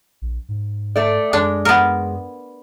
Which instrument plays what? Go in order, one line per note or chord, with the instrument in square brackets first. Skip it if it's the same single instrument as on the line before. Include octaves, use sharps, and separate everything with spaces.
[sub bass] A#1
G#2
[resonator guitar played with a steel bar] A3 D5
[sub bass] F#2 [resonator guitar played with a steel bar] G#3 [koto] D4
[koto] B3 A#4